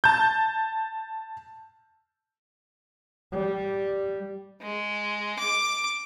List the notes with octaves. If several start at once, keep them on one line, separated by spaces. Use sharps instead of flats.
A5 G6
G3
G#3
D6